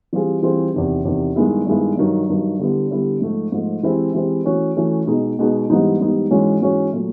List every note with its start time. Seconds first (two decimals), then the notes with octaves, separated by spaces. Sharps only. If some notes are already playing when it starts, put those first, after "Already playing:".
0.13 E3 G3 C4 F4 G#4
0.42 E3 G3 C4 F4 G#4
0.74 E2 C3 D#3
1.05 E2 C3 D#3
1.36 G2 D#3 G#3 B3 E4
1.67 G2 D#3 G#3 B3 E4
1.97 G2 D#3 F#3
2.29 G2 D#3 F#3
2.59 D3 G3 B3 E4
2.91 D3 G3 B3 E4
3.22 G#2 F3 A3
3.52 G#2 F3 A3
3.83 E3 G#3 C4 E4 G4
4.15 E3 G#3 C4 E4 G4
4.45 E3 A3 C#4 F#4
4.76 E3 A3 C#4 F#4
5.07 B2 G#3 B3 D#4 G#4
5.39 B2 G#3 B3 D#4 G#4
5.70 G#2 E3 G3 B3 D#4
6.01 G#2 E3 G3 B3 D#4
6.31 G#2 E3 G#3 C#4 F#4
6.62 G#2 E3 G#3 C#4 F#4
6.93 A#2 F#3 A3